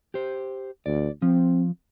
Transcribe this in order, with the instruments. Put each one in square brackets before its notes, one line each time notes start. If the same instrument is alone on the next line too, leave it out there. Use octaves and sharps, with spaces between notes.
[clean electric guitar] G4 C5
[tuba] D2 [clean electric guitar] D5
[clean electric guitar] F3 [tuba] C4